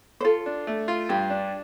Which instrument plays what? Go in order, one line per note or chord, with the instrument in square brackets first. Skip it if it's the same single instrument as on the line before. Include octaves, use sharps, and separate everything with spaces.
[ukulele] C5
[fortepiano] F4 [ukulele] A4
[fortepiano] D4
A3
F4
[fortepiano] G2 [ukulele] G4
[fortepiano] D4